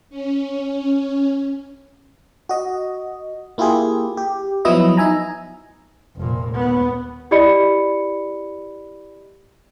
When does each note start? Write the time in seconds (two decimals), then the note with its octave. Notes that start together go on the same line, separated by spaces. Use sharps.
0.10 C#4
2.49 F#4 D#5
3.58 A#3 E4 F4 G4 G#4
4.17 G4
4.65 F3 F#3 B3 E4 D#5
4.97 D#4 E5 G#5 A#5
6.16 F1 A#2
6.53 D#2 B3
7.31 E4 G4 D5 D#5 B5 C#7